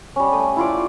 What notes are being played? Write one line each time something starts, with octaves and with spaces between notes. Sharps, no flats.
G3 C#4
A3 D#6
E4 F4 D5